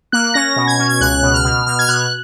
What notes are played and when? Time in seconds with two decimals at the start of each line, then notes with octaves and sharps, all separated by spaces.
0.12 A#3 F#6
0.34 C#4 A#6
0.56 B2
0.67 G#6
0.79 C#4
0.89 G#6
1.00 C#2 F#6
1.22 B2
1.34 F6
1.45 B2
1.66 B2 F6
1.79 G#6
1.88 B2 F#6